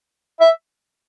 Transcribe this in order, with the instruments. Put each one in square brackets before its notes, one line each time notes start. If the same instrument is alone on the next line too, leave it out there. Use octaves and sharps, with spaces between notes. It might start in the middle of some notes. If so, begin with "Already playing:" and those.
[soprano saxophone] E5